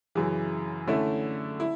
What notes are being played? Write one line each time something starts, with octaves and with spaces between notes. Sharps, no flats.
F#2 C#3 E3
D3 A3 C#4 E4
E4